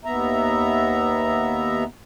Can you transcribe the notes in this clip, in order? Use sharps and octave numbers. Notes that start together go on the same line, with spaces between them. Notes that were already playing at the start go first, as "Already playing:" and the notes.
D#2 B3 E5 A#5